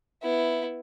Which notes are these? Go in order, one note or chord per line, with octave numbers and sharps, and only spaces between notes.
B3 E4